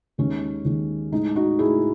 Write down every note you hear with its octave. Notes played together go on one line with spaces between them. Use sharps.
D#2 D#3 G#3 C#4
D#2 D#3 G#3
A2 G#3 D#4
D#4 F#4
A2 G#3 E4 G#4